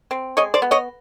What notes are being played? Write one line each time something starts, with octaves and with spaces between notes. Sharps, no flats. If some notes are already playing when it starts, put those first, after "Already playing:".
C4
G#3 C#5 D#5
C5 D5
B3
C#5 D#5